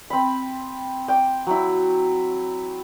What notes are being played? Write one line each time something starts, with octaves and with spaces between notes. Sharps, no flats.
C4 B5
G5 D6
F#3 E4